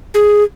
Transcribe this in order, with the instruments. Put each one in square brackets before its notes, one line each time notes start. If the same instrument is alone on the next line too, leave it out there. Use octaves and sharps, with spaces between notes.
[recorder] G#4